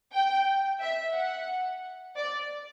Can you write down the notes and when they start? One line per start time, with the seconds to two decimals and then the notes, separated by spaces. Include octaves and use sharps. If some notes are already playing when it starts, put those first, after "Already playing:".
0.13 G5
0.81 E5
1.15 F#5
2.17 D5